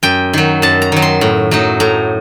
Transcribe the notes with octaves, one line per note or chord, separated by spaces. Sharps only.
F#2 G5
D#3 F#3
F#2 A5
A#5
D#3 F#3
C6
A2
F#3 A3 D#4
A2 A#5